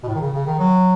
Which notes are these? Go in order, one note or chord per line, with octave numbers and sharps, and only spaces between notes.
B2
A2
D#3
C#3
C#3
D#3
F#3